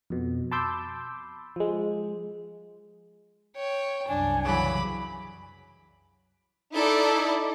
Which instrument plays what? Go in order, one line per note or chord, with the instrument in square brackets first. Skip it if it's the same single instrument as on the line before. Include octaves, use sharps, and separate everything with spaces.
[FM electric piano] F2 B2
A5 B5 C6 D6 E6 G6
F3 G#3
[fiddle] C#5 G5
[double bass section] C2 F#2 [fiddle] D4 [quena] G#5
[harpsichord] C#3 E3 F#3 [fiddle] B5 D6
[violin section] D#4 E4 A4 D5